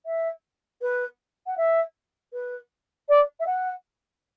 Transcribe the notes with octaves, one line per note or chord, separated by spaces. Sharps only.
E5
B4
F#5
E5
B4
D5
E5
F#5